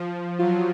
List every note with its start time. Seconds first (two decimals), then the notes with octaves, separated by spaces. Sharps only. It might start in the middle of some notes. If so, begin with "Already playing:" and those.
Already playing: F3
0.40 F#3 F4